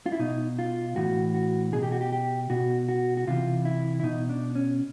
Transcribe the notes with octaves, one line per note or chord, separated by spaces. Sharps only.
F4
E4
B2 D#4
F4
A2 E3 F#4
F#4
B2 G#4
G4
F#4
G4
G4
B2 F#4
F#4
F#4
C3 E3 F4
E4
E4
B2 D#4
D4
C#4